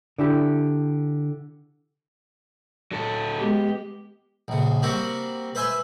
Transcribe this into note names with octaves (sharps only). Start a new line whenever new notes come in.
D3 E4 G4
F#3 A4
G#3 B3 G4
A#1 C#3
G3 A#3 C4 F#4
B4 C5 E5 G#5 C6